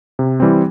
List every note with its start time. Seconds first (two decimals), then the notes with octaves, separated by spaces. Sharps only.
0.19 C3
0.40 E3 G3 C4